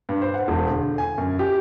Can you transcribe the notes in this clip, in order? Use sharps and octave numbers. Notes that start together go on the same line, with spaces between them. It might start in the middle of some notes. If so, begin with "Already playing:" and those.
G2
C5
F#5
E1
D3
G#5
F#2
G4